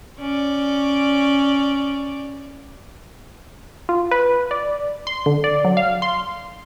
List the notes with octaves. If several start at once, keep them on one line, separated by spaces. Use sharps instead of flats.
C#4 D5
F4
B4
D5
C6
D3
D5
F#3
F5
C6